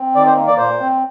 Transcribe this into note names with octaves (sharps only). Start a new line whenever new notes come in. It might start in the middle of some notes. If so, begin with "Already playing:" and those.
Already playing: C4
D#3 D5
C5
A#3
D5
A#2 C5
C4